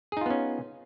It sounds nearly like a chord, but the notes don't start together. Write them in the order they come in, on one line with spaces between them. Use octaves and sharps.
G#4 D#4 F4 B3 C#4